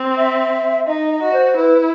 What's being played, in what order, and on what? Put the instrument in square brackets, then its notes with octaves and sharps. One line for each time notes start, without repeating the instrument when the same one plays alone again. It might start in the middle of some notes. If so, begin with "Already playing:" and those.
Already playing: [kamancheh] C4
[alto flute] E5
[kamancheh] D#4 [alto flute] D#5
[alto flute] D#5
[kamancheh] F#4
[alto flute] C5
[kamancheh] E4 [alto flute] B4